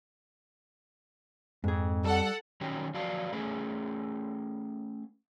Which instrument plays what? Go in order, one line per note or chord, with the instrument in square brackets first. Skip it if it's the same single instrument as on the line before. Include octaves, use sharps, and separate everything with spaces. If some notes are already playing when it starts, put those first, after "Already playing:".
[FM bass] F2 [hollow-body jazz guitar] G#2 G#4
[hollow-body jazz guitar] G3 [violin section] A4 F#5
[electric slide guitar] D#3 F#3 C#4 G4
F3 F#3 F#4 D5 F5 A5
A3 C#4 G#4 B4